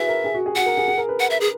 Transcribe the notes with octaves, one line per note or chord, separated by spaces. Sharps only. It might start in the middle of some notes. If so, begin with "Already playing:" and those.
Already playing: E4 F#4 G#4 B4 E5
A#4
G#4
F#4
G#4
F#4 F#5
A#4
G#4
G#4
A#4
B4
F#5
E5
G#4